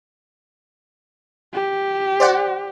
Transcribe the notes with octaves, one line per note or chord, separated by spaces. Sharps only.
G4
C5 D5 F#5